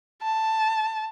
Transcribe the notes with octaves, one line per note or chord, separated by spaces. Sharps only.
A5